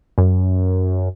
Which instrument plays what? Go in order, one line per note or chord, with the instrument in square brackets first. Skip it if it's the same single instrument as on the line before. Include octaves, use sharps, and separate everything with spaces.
[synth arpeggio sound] F#2